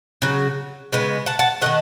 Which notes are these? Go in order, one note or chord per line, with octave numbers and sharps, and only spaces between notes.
C#3 F#3
C#3 G#3 B3
F#5 A5
F#5 A5
D#3 F#3 A3 D#5 F#5